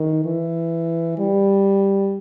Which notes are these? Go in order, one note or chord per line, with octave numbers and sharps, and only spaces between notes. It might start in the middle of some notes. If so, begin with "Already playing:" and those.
Already playing: D#3
E3
G3